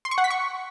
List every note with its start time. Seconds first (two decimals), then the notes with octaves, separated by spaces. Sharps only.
0.05 C6
0.11 C#6
0.18 F#5
0.24 B6
0.30 C#6